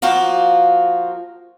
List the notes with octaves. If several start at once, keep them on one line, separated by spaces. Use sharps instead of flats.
F3 A#3 F4 F#4